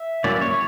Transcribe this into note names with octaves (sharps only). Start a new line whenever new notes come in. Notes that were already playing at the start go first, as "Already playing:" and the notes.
Already playing: E5
F#3 A#3 C#4 E4 D5
C#5